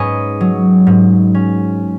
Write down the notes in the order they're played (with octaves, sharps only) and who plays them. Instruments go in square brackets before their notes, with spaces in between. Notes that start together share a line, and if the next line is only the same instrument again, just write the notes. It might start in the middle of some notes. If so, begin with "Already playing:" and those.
Already playing: [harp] G#2 C#4 G#4 B4 C#5 D#5
F#3
G#2
C#4